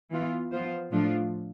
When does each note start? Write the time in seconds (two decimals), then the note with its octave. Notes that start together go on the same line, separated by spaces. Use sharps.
0.11 E3 B3 F4
0.52 F3 B3 F4 C5
0.92 A2 F3 A3 D4 F4